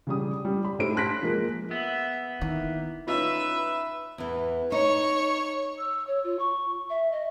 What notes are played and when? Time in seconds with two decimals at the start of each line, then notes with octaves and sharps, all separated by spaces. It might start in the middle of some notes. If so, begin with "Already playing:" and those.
0.07 C#3 G3 D#6
0.45 G3
0.64 B5
0.79 G#2 A3 G4 C5 D7
0.96 A5 C6 F#6 A#6 B6
1.22 F3 G#3 A#3
1.71 B3 E5
2.41 D#3 A#3 E4
3.08 C#4 D#4 F4 B4 E5
4.18 E2 E3
4.72 D#4 C#5 C#6
5.78 E6
6.07 C#5
6.24 F4
6.39 C#6
6.90 E5
7.12 D#5